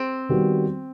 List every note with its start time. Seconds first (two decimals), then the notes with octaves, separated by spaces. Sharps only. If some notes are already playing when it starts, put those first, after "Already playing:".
Already playing: C4
0.29 D#3 G3 B3 F#4